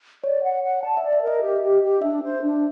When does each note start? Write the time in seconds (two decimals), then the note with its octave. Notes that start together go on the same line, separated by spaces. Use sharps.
0.24 C#5 D5
0.43 F#5
0.63 F#5
0.83 D5 A5
0.97 D5 E5
1.13 E5
1.22 A#4
1.27 D#5
1.42 G4
1.62 G4
1.83 G4
2.01 D4 E5
2.22 C5
2.42 D4